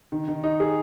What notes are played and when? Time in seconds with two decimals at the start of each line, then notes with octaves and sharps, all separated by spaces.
0.12 D#3
0.28 D#3
0.44 D#4
0.60 G#4